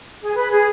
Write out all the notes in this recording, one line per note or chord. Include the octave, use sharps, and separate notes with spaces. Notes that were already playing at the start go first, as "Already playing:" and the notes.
G#4
B4
G#4